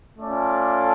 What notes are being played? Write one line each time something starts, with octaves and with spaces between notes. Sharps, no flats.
A3 C#4 F4 A4 D5